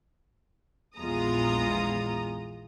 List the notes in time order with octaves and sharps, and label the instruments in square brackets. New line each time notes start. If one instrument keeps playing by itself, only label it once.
[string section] A#1 E2 G#3 F4 A#5 D#6